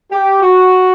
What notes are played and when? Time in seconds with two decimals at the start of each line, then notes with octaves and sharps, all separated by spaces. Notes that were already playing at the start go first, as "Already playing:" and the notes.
0.11 G4
0.42 F#4